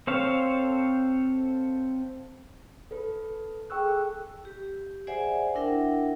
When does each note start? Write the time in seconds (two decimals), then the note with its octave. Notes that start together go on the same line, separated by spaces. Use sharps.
0.07 C4 A4 C5 C#5 F5
2.91 A4 B4
3.70 G#4 A4 G5 C#6 E6 F#6
4.45 G4
5.07 G#4 C5 D5 E5 F#5 G#5
5.55 D4 E4 A#4 E5 F#5 G5